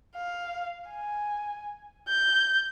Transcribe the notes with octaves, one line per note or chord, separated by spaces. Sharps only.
F5
G#5
G6